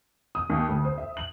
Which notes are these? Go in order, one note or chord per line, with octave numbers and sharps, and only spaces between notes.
D#6
D#2
D2
C5
E5
F#7